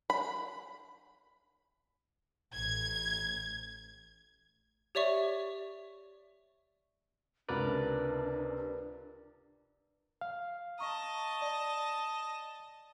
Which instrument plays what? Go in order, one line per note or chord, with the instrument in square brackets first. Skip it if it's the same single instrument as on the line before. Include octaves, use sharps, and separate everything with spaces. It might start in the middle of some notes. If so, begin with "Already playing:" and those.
[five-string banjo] B5
[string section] A1 G#6
[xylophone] G4 C#5 D5 E5 C#6
[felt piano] C#2 C3 [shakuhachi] D4 [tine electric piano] A#4 B4 D5
[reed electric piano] F5
[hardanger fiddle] D#5 A5 [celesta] A#5 C#6
[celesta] D5